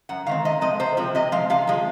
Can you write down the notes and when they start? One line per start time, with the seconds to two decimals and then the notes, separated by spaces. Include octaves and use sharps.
0.09 F#2 F#5
0.27 D#3 G#3 C4 F5
0.45 C3 D#5
0.61 F3 G#3 C4 D#5
0.80 C3 C5
0.97 F3 G#3 C4
1.15 C3 D#5
1.32 F3 G#3 F5
1.50 C3 F5
1.67 F3 G#3